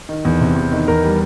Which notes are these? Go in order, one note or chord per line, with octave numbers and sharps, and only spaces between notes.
D#3
E2
C3
E2
D#3
E2 A#4
G3